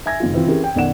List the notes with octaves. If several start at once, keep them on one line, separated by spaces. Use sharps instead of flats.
E5 G#5 G#6 A#6
F#1 D#3 F4
E3 C4 F4
E3 C4 C#4 G4 G#4 A#4
G5
B1 F#2 D#3 D5 F#5 E7